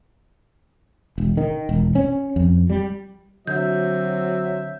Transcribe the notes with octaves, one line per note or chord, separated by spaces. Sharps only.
E1
D#3
E1
C#4
F2
G3
D3 F#3 C4 F#4 E5 G6